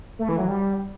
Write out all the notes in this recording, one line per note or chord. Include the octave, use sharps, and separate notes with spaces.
A3
E3
F#3
G3